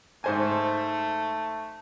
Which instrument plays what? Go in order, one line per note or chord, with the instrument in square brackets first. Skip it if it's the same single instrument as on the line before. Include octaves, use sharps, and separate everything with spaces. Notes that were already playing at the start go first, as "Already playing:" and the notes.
[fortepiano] G#2 C5 G#5 [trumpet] A3